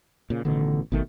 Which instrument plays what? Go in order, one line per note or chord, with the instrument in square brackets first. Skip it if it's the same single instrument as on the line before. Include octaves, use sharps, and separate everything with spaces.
[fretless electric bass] A#2 C#3
[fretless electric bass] A1 B2 D#3 [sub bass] D3
[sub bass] G#1 [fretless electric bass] B2 D#3 A3